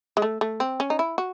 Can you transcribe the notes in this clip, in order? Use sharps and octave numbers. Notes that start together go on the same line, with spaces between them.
G#3
A3
A3
C4
C#4
D#4
E4
F#4